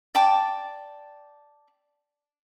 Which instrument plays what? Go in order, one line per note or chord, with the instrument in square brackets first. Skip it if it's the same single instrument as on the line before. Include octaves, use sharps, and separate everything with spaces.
[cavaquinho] D5 G5 A5 D6